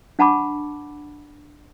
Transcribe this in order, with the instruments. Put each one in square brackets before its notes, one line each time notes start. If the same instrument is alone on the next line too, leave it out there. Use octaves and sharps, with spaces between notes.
[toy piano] D4 F#5 A5 B5 C#6 D6